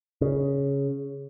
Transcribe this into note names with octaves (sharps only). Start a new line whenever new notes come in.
C#3